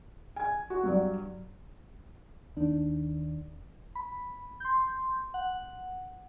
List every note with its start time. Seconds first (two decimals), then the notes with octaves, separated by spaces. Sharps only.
0.36 G#5 G#6
0.70 F#4
0.83 G2 F#3 D5
2.57 D#2 D#3 D4
3.95 B5
4.60 C6 G6
5.34 F#5